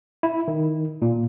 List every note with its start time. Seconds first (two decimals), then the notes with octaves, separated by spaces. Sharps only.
0.23 E4
0.48 D#3
1.02 A#2